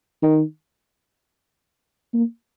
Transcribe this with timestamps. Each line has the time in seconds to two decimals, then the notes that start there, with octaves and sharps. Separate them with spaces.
0.22 D#3
2.13 A#3